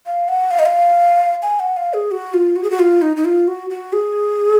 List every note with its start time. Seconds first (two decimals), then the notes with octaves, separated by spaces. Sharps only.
0.06 F5
0.28 F#5
0.51 F5
0.59 D#5
0.66 F5
1.42 G#5
1.60 F#5
1.77 F5
1.94 G#4
2.11 F#4
2.34 F4
2.56 F#4
2.63 G#4
2.70 F#4
2.79 F4
3.02 D#4
3.17 D#4
3.25 F4
3.48 F#4
3.70 F#4
3.93 G#4